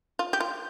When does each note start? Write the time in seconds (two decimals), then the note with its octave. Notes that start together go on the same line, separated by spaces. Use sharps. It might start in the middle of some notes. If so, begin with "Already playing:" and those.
0.19 F4
0.33 G4
0.40 F4